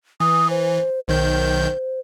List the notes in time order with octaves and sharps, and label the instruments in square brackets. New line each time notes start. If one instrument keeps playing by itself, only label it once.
[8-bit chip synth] E3 [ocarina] D#6
[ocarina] C5
[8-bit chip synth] B1 D#3 G6 [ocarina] C5